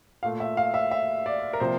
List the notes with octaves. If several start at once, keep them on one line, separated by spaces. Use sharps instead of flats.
A#2 A3 F5
E5
F5
E5
E5
D5
A#4
C3 F3 A#3 C5